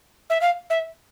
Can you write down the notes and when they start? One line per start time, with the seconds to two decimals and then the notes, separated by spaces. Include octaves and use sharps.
0.30 E5
0.41 F5
0.70 E5